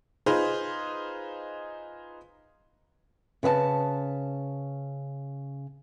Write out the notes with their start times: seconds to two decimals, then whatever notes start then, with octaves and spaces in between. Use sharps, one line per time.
0.26 D#4 F4 G#4 B4 C5
3.43 C#3 B4 E5 A5